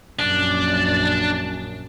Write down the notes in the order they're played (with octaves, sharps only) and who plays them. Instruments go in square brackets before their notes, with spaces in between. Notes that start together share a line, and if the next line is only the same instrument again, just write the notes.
[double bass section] A#1 F#2 [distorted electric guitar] D4